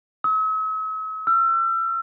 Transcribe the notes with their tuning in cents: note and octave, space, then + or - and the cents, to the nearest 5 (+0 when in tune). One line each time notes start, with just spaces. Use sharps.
E6 -45
E6 +40